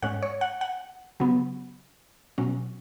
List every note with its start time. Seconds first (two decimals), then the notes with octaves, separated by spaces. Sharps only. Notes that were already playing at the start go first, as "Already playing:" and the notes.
0.02 G#2 G#3 C#4 F#5
0.22 C#5
0.41 F#5
0.61 F#5
1.20 C#3 F#3 B3
2.38 B2 F#3 C#4